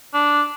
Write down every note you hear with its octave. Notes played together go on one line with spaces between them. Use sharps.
D4